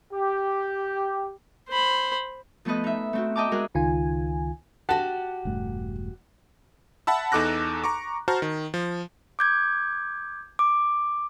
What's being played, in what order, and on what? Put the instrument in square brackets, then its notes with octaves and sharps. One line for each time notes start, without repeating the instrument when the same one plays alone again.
[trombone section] G4
[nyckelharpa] C5 B5
[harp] F3 A3 B3 A4 B4 D#5
D#4 E5
A3 C4 F#4
D#5 E5 G5 A5 A#5 D6
G#3 F#4 G#4 A#4 F#6
[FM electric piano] C#2 D#3 F4 G#5
[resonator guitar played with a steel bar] F#4 G4 [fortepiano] F#5 A5
[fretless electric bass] E1 G2 A3
[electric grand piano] E5 F#5 A5 B5 E6
E2 D#4 A4 D6 F#6 A#6
A#5 C#6 D6
F#4 C5 A5 A#5 F6
D#3
F3
[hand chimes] D6 G6 G#6
D6